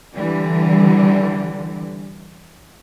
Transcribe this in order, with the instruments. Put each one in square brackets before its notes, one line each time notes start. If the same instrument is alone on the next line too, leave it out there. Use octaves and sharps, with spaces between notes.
[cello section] D3 E3 G3